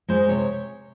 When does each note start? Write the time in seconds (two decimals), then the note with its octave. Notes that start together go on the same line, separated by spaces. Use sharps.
0.08 G#3 C5
0.28 C3 C#5